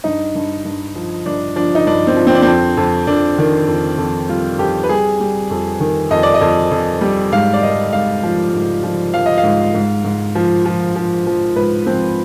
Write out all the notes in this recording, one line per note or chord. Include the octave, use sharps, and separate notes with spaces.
G2 D#4
G2
G2
F3
G2 D4
F3 D4
D#4
G2 D4
C4
F3
C4
D4
F2 C4
F2
F2 D4
D#3
F2
F2
G3 F4
F2 G4
B4
G3 G#4
G3
F2
D#3
F2 D#5
D5
D#5
F2
F2
G3
G#2 F5
D5
G#2 D#5
G#2 F5
F3
G#2
F3
F3 F5
D#5
F5
G#2
G#2
G#2
F3
F3
F3
F3
G#2 B4
F3 C4